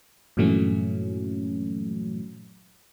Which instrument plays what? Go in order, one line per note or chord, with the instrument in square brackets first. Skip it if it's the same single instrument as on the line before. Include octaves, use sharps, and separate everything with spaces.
[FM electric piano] G2 A#2 E3 F#3 A3 C#4